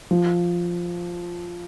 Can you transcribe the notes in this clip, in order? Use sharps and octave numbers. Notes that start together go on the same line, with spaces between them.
F3